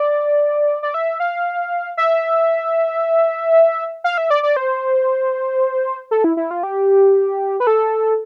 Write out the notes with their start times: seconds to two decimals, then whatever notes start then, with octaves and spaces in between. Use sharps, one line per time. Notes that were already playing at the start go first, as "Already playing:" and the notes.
Already playing: D5
0.83 D5
0.94 E5
1.20 F5
1.97 E5
4.04 F5
4.18 E5
4.30 D5
4.43 D5
4.56 C5
6.11 A4
6.24 E4
6.37 E4
6.51 F4
6.63 G4
7.60 B4
7.67 A4